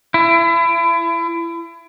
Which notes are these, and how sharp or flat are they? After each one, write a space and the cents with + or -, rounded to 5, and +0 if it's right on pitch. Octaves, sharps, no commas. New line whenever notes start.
E4 +30